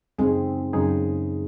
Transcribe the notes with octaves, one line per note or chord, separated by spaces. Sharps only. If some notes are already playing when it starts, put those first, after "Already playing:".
F#2 C#3 G#3 C4 D#4 G#4
F#2 C#3 G#3 D#4 G#4